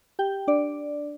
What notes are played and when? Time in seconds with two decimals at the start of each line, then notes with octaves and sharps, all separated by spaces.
0.19 G4 G5
0.48 D4 D5